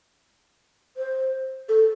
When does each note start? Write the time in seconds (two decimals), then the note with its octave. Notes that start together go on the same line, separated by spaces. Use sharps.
0.97 C5
1.69 A4